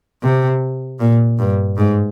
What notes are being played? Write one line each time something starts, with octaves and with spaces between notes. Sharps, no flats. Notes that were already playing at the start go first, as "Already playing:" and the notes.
C3
A#2
G2
G#2